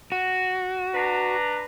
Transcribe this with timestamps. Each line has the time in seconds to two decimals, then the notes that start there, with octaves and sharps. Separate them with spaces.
0.12 F#4
0.94 D4 B4 A#5